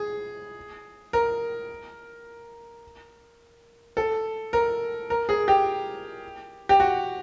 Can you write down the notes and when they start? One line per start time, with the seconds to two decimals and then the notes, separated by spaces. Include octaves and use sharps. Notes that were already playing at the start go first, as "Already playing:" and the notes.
Already playing: G#4
1.13 A#4
3.97 A4
4.53 A#4
5.10 A#4
5.29 G#4
5.48 G4
6.69 G4
6.80 F#4